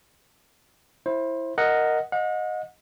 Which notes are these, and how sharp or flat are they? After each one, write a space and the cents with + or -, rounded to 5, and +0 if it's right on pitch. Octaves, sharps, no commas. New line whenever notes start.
E4 +0 C5 +25
A#4 -5 D#5 +0 F#5 +0
D#5 +0 F#5 -40